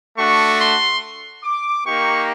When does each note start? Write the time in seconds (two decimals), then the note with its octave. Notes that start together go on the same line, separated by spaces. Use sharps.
0.18 A3 D4 F#4 C#6
0.60 C6
1.44 D6
1.86 A#3 D#4 G4 C#6